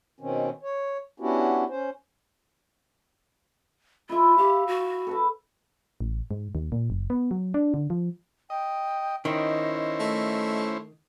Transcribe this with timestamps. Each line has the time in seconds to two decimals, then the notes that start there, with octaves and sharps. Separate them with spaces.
0.20 B2 D#3 C4 C#4
0.63 C#5
1.20 B3 C#4 D4 E4 F#4 G4
1.70 C#4 C5
4.09 E4 F4 E5
4.38 G4 F5
4.67 F#4
5.07 A4 B4 A5
6.01 A1
6.31 G#2
6.55 D#2
6.72 A#2
6.90 F#1
7.10 B3
7.31 F#3
7.54 D4
7.74 D3
7.90 F3
8.50 D#5 G5
9.25 D#3 C#4 E4 C5 D#5
10.00 A3